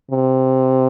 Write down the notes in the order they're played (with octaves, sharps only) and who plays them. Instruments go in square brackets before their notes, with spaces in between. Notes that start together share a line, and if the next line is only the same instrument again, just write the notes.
[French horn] C3